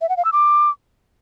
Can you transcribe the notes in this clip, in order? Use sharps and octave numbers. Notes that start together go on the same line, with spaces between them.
E5
F#5
F5
E6
D6